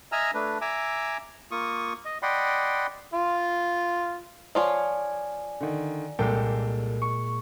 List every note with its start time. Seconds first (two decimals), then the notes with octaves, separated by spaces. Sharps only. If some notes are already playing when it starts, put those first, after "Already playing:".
0.12 D#5 E5 G#5 A#5 E6 F6
0.34 A3 D4 B4
0.61 E5 G#5 A#5 D6 E6
1.51 A#3 F4 C#6 D#6
2.05 D#5
2.23 D5 D#5 F#5 G5 B5 C6
3.14 F4
4.55 F3 F4 C#5 D5 G#5
5.61 D3 D#3
6.19 C2 A#2 G#3 A#3 A4 A#4 G5
7.02 C#6